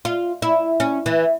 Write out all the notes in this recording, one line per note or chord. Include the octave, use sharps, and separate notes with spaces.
F4
E4
C#4
E3